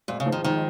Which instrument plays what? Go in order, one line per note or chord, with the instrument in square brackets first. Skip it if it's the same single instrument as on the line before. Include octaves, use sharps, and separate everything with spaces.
[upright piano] G#1 [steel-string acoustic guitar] A#2
[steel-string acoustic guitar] C#3
[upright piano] G#2 F3
[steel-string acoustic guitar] D#3
[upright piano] G#1 [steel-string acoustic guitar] D#3